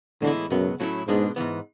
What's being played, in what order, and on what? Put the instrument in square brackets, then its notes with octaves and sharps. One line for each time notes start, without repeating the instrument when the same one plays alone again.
[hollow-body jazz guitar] A2 E3 G#3 B3 E4 [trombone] D3
[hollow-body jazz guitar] C#2 B2 F#3 B3 [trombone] F#2
[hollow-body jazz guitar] A2 F#3 A3 C#4 E4
[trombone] G#2 [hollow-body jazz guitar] B2 G#3 B3 D4
[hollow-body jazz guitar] G#2 E3 B3